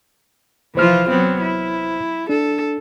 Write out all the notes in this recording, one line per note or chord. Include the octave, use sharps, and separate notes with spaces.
C2 E3 F3 F4 C5 F6
F#3 B3 C4
E4
D4 A4